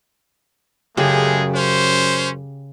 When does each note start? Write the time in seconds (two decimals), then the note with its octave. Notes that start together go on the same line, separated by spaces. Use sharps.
0.97 F#2 C#3 G#3 A3 G4 G#4
1.54 C#4 C5